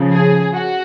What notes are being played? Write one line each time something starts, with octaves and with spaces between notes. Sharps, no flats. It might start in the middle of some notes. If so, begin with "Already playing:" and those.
Already playing: C#3 F3
G#4
F#4